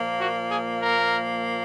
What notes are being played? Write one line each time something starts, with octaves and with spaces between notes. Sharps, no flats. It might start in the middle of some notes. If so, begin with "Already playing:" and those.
Already playing: A#2 F3 A#3
F#4
G#4
A#4